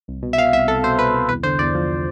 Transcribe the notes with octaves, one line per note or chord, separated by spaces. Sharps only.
C2
B2
E5
B2 F5
C2 E5
C2 A4
B2 C5
B2 B4
C2
E2 B4
D3 C5
E2 D5
F3